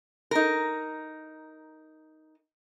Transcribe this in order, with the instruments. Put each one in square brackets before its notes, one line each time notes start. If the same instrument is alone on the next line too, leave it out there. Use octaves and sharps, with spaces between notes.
[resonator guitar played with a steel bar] D#4 A#4